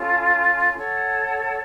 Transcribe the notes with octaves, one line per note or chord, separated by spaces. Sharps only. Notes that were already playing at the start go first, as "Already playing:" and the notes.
Already playing: C#4 F4 A4
A4 C#5 F#5